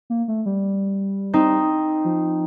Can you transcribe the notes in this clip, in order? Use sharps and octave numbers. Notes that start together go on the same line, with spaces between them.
A#3
A3
G3
C4 D#4
F3